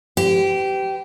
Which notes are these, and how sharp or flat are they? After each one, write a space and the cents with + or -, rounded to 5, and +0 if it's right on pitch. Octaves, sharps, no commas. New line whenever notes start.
G4 -20 B4 +45